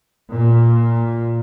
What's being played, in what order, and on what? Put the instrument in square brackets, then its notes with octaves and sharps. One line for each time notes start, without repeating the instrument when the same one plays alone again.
[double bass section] A#2